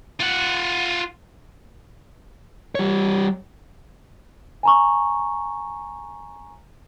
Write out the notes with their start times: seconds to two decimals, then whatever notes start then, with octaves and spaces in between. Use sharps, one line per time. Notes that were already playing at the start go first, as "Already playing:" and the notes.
0.20 F4 F#5
2.75 G3 C#5
4.63 G#5 A#5 C#6